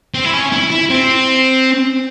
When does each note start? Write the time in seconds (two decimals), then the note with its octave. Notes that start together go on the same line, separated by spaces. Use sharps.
0.14 C4
0.24 E4
0.34 C#4
0.53 E4
0.71 E4
0.90 C4